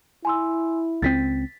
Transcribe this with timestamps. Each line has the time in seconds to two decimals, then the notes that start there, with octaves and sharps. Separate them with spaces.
0.25 E4 G#5 C6 E6
1.02 C#2 G3 C4 A6 B6